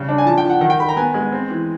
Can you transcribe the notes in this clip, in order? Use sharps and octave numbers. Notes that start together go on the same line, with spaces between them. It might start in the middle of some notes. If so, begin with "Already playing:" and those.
Already playing: C#3 G3
D4
G#5
F3 A5
G5
F3
F#5
D#3 F#5
G5
D#3 B5
A#5
B3 G#5
G#3
C4
E3